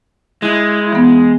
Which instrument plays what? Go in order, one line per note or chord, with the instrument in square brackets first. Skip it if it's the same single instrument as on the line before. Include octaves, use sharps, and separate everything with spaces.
[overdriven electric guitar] G#3 [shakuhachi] E4 [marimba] F#6
[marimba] E3 B3